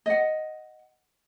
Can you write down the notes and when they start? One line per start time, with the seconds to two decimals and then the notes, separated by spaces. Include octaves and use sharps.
0.06 D#5 F#5